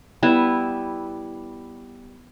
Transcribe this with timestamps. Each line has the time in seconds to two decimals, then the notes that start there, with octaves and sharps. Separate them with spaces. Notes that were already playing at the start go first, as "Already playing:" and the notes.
0.23 G3 B3 E4 E5